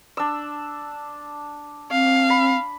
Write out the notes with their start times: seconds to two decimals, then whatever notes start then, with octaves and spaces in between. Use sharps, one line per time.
0.17 D4 E6
1.91 C4 F5
2.30 B5